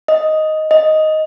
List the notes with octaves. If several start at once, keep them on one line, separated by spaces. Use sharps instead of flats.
D#5
D#5